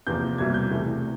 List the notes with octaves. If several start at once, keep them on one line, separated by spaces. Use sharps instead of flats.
E2 C3 F3 A#3 G6
C2 B2 G3 A#3 G#6
G6
E2 C3 E3 A3